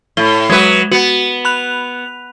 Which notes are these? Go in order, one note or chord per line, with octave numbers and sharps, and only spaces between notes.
A2 G7
F#3 G#3 B4
B3 F#4
B5 F#6 F7